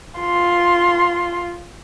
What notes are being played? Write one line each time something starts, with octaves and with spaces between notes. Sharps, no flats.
F4 C6